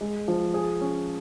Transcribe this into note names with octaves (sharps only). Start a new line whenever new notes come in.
G#3
F3
G#4
C#4